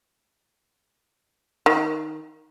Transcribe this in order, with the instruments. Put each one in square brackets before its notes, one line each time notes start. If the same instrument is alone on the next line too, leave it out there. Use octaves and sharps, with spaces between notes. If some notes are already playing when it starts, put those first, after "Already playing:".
[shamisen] D#3